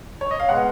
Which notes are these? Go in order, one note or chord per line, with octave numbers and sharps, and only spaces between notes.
C#5
D#5
F5
B2 G#3 B3 F#5